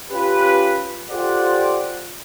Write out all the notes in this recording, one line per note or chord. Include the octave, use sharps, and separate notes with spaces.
C#4 F4 G4 B4
F4 G4 A4 C5 D5 F#5